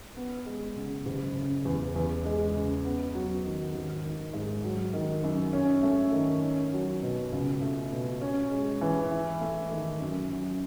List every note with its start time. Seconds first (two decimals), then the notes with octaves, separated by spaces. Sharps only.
0.16 B3
0.46 G#3
0.76 C#3
1.06 F#1
1.36 C#3
1.65 E2
1.96 E2
2.25 G#3
2.55 C#3
2.85 B3
3.14 F#3
3.45 D#3
3.74 G#1
4.04 D#3
4.33 G#2
4.64 F#3
4.93 D#3
5.23 F#2
5.53 C#4
5.83 A3
6.12 D#3
6.43 C#4
6.73 F#3
7.02 B2
7.32 C#2
7.62 A3
7.92 B2
8.21 C#4
8.51 G#3
8.81 E3
9.11 E4
9.41 A3
9.71 D#3
10.01 F#2
10.31 F#3